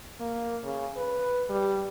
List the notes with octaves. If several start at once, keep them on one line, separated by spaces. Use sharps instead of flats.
A#3
C#3
B4
G3